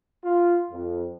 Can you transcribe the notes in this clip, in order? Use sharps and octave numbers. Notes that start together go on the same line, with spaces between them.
F4
F2